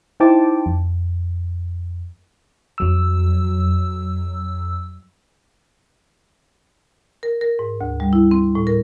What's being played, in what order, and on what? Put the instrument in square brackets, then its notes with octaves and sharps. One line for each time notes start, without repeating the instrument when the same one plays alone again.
[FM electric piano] D#4 E4 C5 G5 A5 D6
F2
F2 F#3 E6
[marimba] A#4
A#4
G#2
D2
G3
E4
C4
A2
A#4